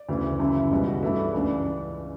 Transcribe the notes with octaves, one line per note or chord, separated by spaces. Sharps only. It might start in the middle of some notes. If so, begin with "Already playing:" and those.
Already playing: D5
D2 C#3 E3
F#2 C#3 E3 E4
E4
C#2 B2 G3 B3
F#4
G2 E3 A3 E4
D4
C#2 C#3 E3 D4